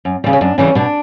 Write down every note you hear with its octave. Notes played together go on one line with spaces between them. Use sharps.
F#2
C#3 E3 G3
C#4
F#2 D4
C#3 E3 G3 C#4
B2 D4